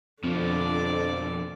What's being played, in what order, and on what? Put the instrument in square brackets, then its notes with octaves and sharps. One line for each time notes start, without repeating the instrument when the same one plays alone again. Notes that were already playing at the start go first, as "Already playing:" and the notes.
[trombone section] F2 [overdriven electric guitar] B2 F3 [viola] D3 D5 [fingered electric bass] C4